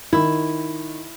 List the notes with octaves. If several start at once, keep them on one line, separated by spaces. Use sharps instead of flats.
D#3 E4